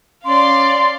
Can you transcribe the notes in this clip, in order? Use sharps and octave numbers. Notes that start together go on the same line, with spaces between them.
C#4 D5 F5 C6